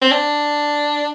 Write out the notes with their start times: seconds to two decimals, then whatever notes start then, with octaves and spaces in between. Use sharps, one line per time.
0.01 C4
0.11 D4